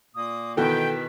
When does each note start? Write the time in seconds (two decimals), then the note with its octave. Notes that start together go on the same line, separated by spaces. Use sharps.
0.16 A#2 A#3 D#6
0.57 B2 D#3 E3 A4 B4 G5